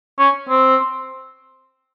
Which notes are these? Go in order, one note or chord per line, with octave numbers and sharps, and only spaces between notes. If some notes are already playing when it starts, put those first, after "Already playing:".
C#4
C4